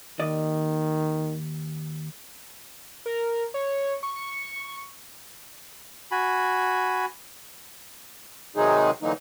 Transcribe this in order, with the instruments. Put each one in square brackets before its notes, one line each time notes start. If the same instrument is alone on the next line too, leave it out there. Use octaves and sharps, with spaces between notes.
[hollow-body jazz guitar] D#2 D5 D#5 [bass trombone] D#3
[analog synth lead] A#4
C#5
C#6
[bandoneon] F#4 G#5 B5
[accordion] C3 D#3 F#3 G#3 D#4 G#4
D3 E3 F#3 A#3 D#4